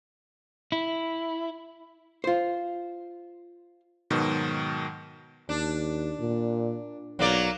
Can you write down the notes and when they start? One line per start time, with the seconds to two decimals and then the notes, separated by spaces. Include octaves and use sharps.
0.72 E4
2.24 F4 C5
4.10 G#2 B2 D#3 F#3
5.49 D#2 D4
6.19 A#2
7.19 B1 F#3 A#3 D5